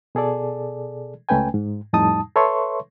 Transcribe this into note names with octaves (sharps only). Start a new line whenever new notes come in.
B2 G#4 A4 D5
C#2 A3 C#4 B4 G5 G#5
G#2
F2 A2 G3 D#4 A5 D#6
A4 B4 C#5 E5 C6 C#6